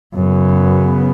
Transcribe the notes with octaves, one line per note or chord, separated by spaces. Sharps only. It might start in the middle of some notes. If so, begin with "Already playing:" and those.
F#2 C#3 F#3 B3